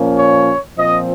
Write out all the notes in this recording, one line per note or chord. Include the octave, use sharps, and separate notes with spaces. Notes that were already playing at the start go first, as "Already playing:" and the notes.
Already playing: A#2 F3 A#3 C#4
C#5
A#2 F3 C4 D#5